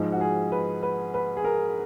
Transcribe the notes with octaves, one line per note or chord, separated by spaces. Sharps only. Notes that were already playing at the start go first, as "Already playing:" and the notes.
Already playing: G#2 F3 G#3
F#4
G#4
B4
B4
B4
G#4
A#4